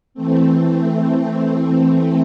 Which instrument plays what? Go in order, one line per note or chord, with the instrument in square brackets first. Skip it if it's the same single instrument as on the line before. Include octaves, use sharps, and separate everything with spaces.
[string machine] E3 A3 C4